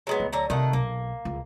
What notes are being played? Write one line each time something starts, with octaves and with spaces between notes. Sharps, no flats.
F#3 G#3 B3
D2
D3 F#3 A#5
C3 D#3 A3 F#5
B1 A#3
C#2